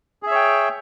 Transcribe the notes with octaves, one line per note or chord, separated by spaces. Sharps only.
G#4 C#5 E5 G5